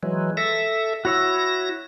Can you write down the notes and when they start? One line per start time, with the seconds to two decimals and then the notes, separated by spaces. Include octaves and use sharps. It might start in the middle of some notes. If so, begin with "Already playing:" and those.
0.03 E3 F#3 G#3
0.37 A4 E5 A#6
1.05 E4 F#4 C#5 E6 A#6